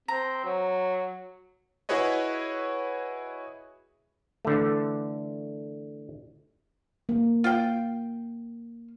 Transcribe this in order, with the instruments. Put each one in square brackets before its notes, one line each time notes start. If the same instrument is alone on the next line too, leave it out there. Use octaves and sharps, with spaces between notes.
[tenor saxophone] C4 [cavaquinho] A#5
[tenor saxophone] F#3
[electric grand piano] E4 F#4 G#4 B4 C#5 D#5
[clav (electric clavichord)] D3 E3 A3
[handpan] A#3
[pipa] F4 F5 G5